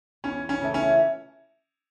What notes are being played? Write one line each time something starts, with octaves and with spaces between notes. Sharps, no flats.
E2 C#4
C#4
C#3 E3 A3
C#4